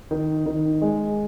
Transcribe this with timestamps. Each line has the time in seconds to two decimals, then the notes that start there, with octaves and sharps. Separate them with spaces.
0.11 D#3
0.46 D#3
0.82 G#3